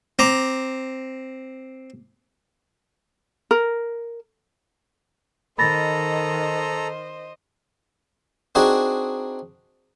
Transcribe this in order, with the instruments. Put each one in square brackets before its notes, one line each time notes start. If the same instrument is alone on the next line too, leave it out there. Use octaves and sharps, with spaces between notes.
[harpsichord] C4 A#5 D6
[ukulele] A#4
[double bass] D#3 [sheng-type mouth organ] A4 A#5 [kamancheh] C5 D#5 [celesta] B5 A6 A#6
[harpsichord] C4 D4 D#4 F#4 G#4